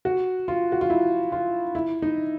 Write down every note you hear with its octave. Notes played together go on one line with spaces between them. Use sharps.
F#4
F4
F#4
F4
E4
F4
E4
D#4